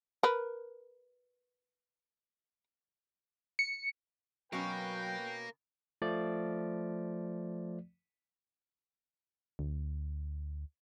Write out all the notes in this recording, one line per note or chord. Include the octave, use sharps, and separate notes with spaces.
A#4 B4
C#7
B2 F#3 C#4 A#4 B4 F5 G5
F3 A3 D5
D2